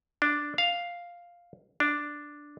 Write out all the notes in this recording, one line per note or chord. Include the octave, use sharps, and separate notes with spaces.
D4
F5
D4